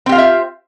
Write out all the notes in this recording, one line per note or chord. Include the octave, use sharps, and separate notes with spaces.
C4 F4 G4 E5 F5